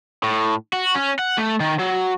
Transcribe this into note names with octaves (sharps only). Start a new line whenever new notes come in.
A2
F#4
C#4
F#5
A3
D#3
F#3